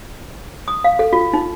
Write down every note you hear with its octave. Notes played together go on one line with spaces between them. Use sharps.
D#6
F5
A4
F4
D#4